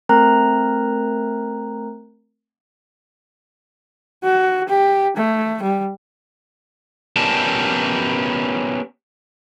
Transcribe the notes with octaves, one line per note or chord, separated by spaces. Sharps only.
A3 C4 A#4 A#5 F#6
F#4
G4
A3
G3
B3 C#4 G4 A#4 D5 A5